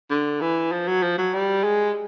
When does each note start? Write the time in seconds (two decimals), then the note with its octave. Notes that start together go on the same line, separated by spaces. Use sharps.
0.10 D3
0.41 E3
0.72 F3
0.88 F#3
1.02 F3
1.17 F#3
1.34 G3
1.63 G#3